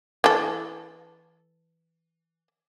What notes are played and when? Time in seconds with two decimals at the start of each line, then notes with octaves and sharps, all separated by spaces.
0.24 E3 A4